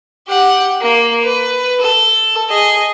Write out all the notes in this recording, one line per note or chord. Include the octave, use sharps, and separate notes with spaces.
G4 F#5
A#3
B4
A4
G#4 D#5